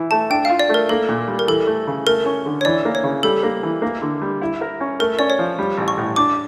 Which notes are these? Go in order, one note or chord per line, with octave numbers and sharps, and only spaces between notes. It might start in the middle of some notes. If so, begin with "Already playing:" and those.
Already playing: E3 E4
A3 A5
D4 G5
F4 F5
D5
A3 A#4
A#3 A4
A#2
G3
A#4
E3 A4
A3
C#3
A3 A#4
C#4
D3
C#5
E3 D5
A#3
C#5
C#3
G3 A4
A#3
E3
A#3
D3
G3
E4
A#4
C#4
A3 A#4
C#4 D5
C#5
F3
G3
A1
C#6
A2
D4 D6